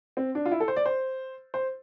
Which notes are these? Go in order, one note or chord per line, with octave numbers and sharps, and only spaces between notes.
C4
D4
F4
E4
A4
C5
D5
C5
C5